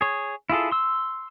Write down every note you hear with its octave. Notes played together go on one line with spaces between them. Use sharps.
G#4 C#5
E4 F4 G#4 A4
C6 E6